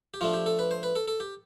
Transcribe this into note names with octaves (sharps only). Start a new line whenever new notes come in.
G4
F3 A3 D4 F4
G4
A4
B4
C5
B4
A4
A4
G4